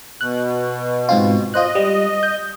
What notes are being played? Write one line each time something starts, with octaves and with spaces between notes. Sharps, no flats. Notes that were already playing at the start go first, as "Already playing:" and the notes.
B2 F#6
G#2 C4 F4
F4 C5 D#5 F#6
G3
G6